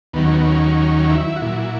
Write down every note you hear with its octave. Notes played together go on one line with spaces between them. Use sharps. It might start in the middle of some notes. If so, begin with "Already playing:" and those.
D#2 D#3 F#3 B3
C#4
B3
C#4
E4
F#4
A#2 F#3 E4